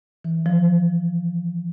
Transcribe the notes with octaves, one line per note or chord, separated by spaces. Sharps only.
E3
F3